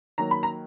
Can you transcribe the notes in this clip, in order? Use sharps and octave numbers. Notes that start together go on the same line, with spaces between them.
D#3 F#3 A#3 A#5
B5
A#5